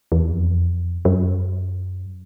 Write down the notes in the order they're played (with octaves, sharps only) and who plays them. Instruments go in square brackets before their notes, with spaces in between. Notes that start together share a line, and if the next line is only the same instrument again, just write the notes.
[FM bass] E2
F2
F#2